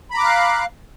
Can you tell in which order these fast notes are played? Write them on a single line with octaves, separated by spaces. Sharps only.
B5 A#5 D6 F#6 F5